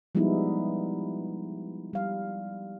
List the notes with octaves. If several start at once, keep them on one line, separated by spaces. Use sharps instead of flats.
F3 G3 G#3 B3 D#4 E4
G3 F5